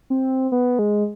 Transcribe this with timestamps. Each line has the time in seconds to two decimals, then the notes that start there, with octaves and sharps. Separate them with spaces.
0.10 C4
0.52 B3
0.79 G#3